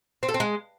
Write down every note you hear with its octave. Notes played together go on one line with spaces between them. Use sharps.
C4
A4
C4
G#3